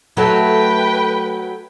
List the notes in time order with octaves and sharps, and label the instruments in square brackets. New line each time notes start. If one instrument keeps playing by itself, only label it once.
[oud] F#3 A3 [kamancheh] B4 G5